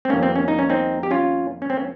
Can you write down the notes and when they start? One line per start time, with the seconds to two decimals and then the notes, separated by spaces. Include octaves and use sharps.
0.05 C4
0.09 F2 D#3 G3 A#3 C#4
0.23 C4
0.36 C#4
0.48 D#4
0.59 C#4
0.70 C4 D#4
1.03 G4
1.11 C#4 F4
1.62 C#4
1.70 C4
1.77 C#4